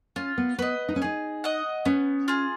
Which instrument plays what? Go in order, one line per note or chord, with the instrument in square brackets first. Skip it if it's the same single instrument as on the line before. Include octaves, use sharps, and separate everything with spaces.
[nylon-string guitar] C#4 [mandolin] F4
[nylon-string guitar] B3
[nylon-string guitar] B3 [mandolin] B4 D#5
[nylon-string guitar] D#4
C#4
[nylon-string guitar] D#4 [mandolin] G#4
[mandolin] D#5 F#5
[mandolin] B3 [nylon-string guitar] C#4
[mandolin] F4 G#4